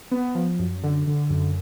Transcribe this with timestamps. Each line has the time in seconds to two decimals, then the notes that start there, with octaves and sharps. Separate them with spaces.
0.11 B3
0.35 F3
0.59 F#2
0.83 D3
1.07 D3
1.30 F#2